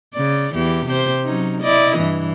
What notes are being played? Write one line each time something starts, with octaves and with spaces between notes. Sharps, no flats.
C#3 D5
E2 E3 G4
C3 G4 C5
F#3 C#4 D#4
E4 D5 D#5
G2 E3